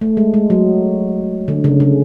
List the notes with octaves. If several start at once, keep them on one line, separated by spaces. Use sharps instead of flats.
A3
G#3
G#3
F#3
D3
C#3
C#3